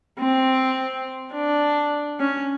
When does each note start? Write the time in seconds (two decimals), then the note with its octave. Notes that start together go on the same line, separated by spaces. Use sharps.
0.19 C4
1.33 D4
2.20 C#4